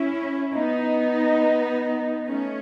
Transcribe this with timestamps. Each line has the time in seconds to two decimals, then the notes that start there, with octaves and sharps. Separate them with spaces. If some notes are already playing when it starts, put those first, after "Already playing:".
Already playing: C#4 E4
0.55 B3 D#4
2.28 A3 C#4